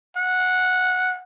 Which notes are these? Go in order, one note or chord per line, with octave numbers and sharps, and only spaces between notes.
F#5